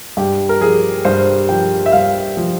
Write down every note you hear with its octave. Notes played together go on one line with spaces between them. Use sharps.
G2 G4
A#4
F3 G#4
G2 C5
F3 G5
E5
G2 F5
F3